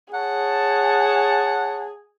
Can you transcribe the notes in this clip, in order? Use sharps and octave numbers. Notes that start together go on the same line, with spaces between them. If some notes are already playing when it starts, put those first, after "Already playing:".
G#4 C#5 F#5 A5